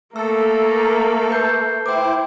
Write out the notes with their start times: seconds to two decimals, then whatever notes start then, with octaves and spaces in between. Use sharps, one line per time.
0.16 A3 A#3 A4 E6
1.30 B4 G6 C7
1.86 E4 C5 G5 D6